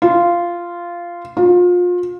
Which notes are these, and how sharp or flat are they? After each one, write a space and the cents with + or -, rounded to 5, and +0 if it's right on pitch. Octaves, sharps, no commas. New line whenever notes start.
F4 -10
F4 +30